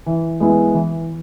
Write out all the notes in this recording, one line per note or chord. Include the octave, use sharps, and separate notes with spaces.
E3
G#3 B3 E4
E3